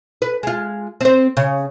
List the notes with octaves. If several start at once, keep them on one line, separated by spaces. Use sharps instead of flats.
B4
G#3 F4
C4 C5
C#3